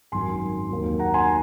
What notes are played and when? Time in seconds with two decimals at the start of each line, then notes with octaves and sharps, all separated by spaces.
0.12 G#1 F#2 D#3 F#3 G#5 C6
0.70 D#2 D#3 F#3
0.99 F#5 A#5
1.14 G#5 C6